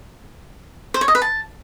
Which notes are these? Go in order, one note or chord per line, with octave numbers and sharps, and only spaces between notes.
C5
C#5
D#5
B4
A5